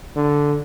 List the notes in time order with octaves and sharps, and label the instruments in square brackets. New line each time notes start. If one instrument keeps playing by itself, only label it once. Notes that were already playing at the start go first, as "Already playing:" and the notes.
[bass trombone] D3